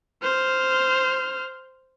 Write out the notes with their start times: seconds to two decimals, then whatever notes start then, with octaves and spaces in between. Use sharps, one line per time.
0.22 C5 F6